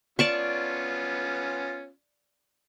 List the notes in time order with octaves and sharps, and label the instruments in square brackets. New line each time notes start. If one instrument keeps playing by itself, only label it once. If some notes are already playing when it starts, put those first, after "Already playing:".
[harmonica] B3 C#4 F4 [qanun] D5 A5 C#6